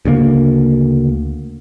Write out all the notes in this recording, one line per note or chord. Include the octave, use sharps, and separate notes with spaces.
D2 C#3 G3 A#3